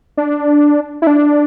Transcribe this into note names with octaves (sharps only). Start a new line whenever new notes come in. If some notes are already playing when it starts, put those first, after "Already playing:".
D4
E4
D4